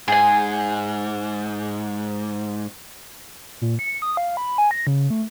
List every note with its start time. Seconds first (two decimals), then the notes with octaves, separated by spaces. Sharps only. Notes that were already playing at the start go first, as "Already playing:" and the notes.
0.08 G#2 G#4 G#5
3.61 A#2
3.79 C#7
4.02 D#6
4.17 F5
4.37 B5
4.58 G#5
4.71 A#6
4.87 C#3
5.10 A3